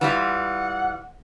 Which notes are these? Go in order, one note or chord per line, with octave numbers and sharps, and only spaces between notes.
E3 G3 F4 F#5